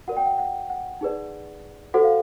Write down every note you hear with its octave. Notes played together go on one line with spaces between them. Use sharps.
F#4 A#4 D5 F#5
G5
F#5
F#5
F#5
D#4 G#4 B4 D5
F#4 A4 C5 F#5
F5